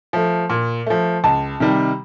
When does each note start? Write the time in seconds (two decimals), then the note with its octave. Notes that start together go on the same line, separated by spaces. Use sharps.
0.13 F3 A3
0.50 A#2
0.86 F3 A3
1.24 C#2 A5
1.60 C3 D#3 G3